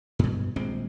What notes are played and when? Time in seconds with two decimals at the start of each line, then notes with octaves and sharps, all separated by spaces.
0.19 G2 B2
0.56 D#1 A#1 G#3 C4